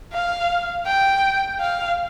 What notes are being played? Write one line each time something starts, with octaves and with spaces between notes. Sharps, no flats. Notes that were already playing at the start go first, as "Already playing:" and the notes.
F5
G5
F5